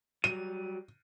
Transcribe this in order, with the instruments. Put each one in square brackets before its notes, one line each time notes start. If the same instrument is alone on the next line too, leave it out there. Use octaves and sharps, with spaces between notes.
[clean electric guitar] F#3 G3 [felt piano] D#7